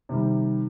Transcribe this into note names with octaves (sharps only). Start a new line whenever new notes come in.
C3 D#3 G3